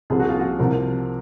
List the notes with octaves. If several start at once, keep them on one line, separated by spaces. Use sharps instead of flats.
C2 C3 F3 G#4
F#4
F4
F#4
C2 C3 F3 A#4